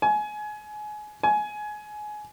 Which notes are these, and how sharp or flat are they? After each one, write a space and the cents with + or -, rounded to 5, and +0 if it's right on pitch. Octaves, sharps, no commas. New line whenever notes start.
G#5 +25
G#5 +20